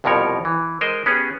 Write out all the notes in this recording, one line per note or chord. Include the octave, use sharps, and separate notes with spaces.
C2 F2 B2 F3 A#4 C#5
E3
G#3 A#4 C5 D#5
B3 C#4 G4 G#4